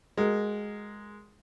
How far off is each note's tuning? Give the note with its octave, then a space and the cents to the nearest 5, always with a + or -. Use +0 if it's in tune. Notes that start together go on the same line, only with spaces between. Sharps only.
G#3 +0 F#4 +15 A#4 +0